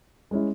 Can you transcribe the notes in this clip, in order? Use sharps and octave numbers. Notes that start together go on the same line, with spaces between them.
G#3 C#4 E4